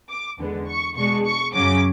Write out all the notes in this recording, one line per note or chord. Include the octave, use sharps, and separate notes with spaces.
D6
E2 D3 G#3 B3
C#6
B2 G#3 D4 C#6
C#6
F#2 C#3 F#3 C#4 D6